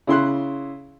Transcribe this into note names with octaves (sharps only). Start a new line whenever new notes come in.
C#3 E4 C6 F#6